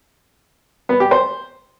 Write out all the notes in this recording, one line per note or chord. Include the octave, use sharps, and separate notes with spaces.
B3
G4
C5